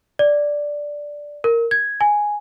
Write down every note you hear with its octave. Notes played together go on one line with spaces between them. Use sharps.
D5
A#4
G#6
G#5